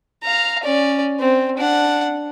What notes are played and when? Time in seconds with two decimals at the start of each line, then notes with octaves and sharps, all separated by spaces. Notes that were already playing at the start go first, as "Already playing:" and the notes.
0.23 F5 A#5
0.63 C#4 D5
1.20 C4
1.58 D4 F#5